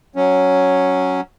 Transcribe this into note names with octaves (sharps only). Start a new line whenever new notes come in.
F#3 C#4